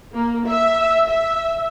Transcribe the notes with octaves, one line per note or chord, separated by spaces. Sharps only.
A#3
E5
E5